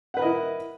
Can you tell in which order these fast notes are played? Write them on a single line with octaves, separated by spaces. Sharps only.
F#5 B4 A#4 D#5 E4